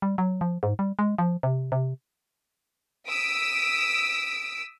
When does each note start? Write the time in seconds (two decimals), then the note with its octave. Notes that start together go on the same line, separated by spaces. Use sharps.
0.02 G3
0.18 F#3
0.41 F3
0.63 G#2
0.79 G3
0.99 G#3
1.18 F3
1.43 C3
1.72 C3
3.08 D#6 E6 B6 D7